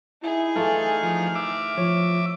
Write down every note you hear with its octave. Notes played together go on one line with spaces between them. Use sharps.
D#4 E4 G#4
E3 A3 F4 A4 F6
F3
E5 D6
F3 C#5